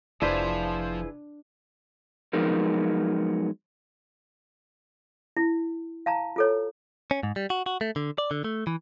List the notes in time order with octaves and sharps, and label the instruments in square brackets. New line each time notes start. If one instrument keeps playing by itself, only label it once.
[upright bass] F1 [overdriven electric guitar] F3 C5 [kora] D4 [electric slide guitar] E4 G#4 B4
[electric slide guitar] F3 F#3 G#3 B3 D#4 A#4
[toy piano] E4
F5 A5 A#5
F4 A4 C#5
[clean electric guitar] C#4
G#2
G3
F#4
F#4
A3
D3
D5
D3
A3
E3